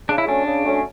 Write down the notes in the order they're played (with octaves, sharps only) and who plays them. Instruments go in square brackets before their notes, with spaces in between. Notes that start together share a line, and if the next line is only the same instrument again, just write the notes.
[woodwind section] C#3 [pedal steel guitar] D4
[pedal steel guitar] E4
[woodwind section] F#3 A3 C#4 [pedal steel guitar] D4
[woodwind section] C#3
F#3 A3 C#4